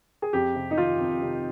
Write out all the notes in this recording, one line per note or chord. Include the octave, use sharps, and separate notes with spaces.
G#4
F2 G4
C3
D#4
D#3 F4
F2
C3